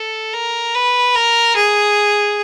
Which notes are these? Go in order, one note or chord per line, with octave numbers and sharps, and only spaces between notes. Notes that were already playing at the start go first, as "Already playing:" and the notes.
Already playing: A4
A#4
B4
A#4
G#4